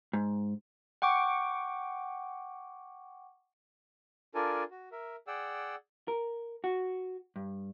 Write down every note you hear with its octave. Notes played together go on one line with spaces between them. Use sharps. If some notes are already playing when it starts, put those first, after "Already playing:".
G#2
F#5 G5 C#6 D6
D4 F4 A4 A#4 D5 G#5
F#4
A#4 E5
G#4 D5 F#5 G5 E6
A#4
F#4
G2